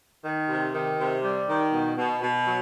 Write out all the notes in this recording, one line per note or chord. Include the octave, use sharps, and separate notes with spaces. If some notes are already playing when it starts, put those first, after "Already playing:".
D#3
C3
D#3
C3
G3
D#3
B2
B2
B2
F#3